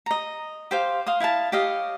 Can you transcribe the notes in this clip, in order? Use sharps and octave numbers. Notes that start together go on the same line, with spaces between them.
D#5 A#5
G4 C5 F5
F5 C6 D#6
E4 F5 G5 A5
G4 C#5 D#5 F5